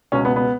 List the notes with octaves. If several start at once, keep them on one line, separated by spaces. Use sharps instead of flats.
C#2 B2 C#4
B3
B3